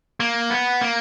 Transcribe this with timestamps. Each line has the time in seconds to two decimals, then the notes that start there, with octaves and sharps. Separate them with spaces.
0.20 A#3
0.50 B3
0.81 A#3